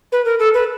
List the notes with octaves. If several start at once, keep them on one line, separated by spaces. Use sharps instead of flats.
B4
A#4
A4
B4